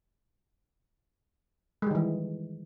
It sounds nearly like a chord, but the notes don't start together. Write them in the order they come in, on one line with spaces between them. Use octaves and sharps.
G#3 G3 D#3 E3